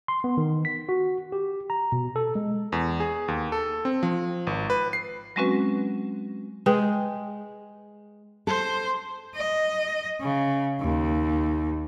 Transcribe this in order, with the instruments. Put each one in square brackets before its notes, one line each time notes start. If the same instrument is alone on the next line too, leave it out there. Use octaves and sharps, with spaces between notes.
[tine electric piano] C6
B3
D#3
B6
F#4
G4
A#5
B2
A4
G#3
[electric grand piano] E2
G#4
D#2
A4
C4
F3
G#1
B4
C7
[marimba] F#3 G#3 C4 C#4 F#4 B4
[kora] G#3 [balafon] B4 G5
[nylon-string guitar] A4 [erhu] C5
[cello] D#5
C#3
D#2